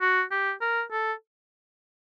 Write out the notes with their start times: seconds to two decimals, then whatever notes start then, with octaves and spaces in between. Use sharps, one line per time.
0.01 F#4
0.31 G4
0.61 A#4
0.91 A4